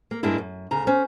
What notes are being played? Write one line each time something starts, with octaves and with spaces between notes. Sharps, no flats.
A#3
G2 G#3 A#3 D4 E4
F#2
D2 C#3 A#5
C#4 C5